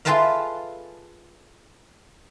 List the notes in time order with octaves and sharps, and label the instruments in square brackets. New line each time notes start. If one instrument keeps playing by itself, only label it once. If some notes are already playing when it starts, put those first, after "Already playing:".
[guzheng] F4 G#4 A4 B4 E5 F5